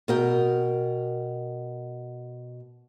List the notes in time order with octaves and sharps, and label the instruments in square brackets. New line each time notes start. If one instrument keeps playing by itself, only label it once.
[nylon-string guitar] B2 A#4 G5